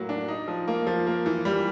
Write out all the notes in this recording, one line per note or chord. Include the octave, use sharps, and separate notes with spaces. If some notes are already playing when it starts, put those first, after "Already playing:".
Already playing: A2 F#3 A#3
D4
D#4
F3
A#3
F3
A#3
E3
G3